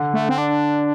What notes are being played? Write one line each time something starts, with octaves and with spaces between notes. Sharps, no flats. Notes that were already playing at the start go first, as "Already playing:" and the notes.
Already playing: D3
A3
C4
D4